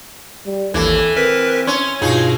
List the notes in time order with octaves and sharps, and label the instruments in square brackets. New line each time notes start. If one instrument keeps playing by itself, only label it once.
[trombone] G3
[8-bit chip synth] G#1 D#2 [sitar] E3 [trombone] A4
[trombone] C4 [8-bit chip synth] A#4 B4 B6
[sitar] C#4 [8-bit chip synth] C6
[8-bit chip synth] G2 B2 [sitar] D#4 G#4 [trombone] F4